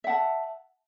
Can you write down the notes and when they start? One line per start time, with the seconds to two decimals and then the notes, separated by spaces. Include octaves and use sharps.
0.04 E5
0.07 F#5
0.09 A5